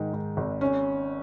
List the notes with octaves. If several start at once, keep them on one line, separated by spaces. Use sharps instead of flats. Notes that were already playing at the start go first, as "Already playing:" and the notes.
Already playing: G#2 D#3
G#2
G#1
C#4